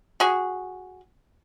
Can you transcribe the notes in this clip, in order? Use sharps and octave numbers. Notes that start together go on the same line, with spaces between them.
F#4 G#4